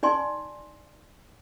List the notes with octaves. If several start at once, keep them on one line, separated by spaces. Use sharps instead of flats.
D#4 D5 G#5 C6